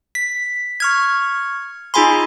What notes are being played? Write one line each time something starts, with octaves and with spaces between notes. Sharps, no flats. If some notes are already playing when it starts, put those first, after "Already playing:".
B6
C#6 F6 G#6
D#4 F4 G#4 G#5 B5 C6